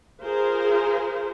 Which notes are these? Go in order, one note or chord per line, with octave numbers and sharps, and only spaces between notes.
F4 G#4 A#4 C5